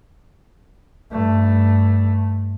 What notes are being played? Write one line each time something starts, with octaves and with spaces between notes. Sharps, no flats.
G2 A3